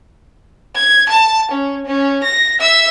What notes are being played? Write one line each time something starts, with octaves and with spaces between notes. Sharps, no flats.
G#6
A5
C#4
C#4
A#6
E5 E6